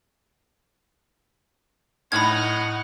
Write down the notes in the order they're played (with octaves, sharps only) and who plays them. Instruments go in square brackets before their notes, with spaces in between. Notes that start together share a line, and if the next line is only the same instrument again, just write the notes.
[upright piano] A2 F6 [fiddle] D#4 [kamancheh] F#5 [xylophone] B5 G#6